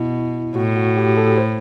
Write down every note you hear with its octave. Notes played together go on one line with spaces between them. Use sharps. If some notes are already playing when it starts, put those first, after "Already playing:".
Already playing: B2 E4
A2 F#4
F#4
G4
A4
C5